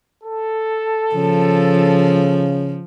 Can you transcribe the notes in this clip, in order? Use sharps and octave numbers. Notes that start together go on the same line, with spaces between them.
A4
C#3 F3